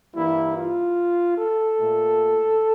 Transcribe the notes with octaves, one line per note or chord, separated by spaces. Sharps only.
G2 E3 G3 A#3 E4
F4
A4
A#2 A3